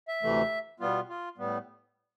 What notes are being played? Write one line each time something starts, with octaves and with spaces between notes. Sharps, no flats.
E5
D2 C3 E3 A3
B2 G3 B3 F4
F4
A2 G3 B3